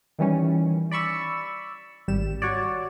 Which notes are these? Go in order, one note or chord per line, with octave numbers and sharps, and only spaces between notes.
D#3 E3 G3 C#4
D5 B5 C#6 E6
G#1 G3 E7
F#4 C#5 D5